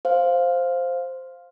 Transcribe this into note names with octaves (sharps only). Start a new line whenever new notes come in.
C5 F5